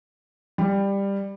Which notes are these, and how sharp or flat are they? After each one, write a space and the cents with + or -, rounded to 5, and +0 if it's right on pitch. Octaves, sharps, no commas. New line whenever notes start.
G3 +15